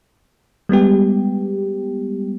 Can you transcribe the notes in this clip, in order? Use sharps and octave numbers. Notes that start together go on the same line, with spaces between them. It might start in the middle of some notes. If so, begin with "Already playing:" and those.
G3 G#3 B3 G4